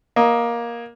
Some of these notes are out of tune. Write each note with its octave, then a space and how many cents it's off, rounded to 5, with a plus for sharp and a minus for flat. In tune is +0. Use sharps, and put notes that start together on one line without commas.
A#3 +15 D#5 +0